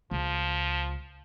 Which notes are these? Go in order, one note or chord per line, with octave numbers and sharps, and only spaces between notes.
C#2 F3